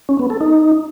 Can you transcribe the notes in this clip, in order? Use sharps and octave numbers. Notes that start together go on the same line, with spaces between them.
C#4
B3
A4
D#4